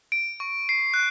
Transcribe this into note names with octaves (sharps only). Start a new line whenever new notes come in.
D7
C#6
C7
F#6